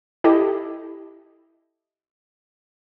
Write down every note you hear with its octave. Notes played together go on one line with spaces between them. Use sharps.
E4 G4 A4 D#5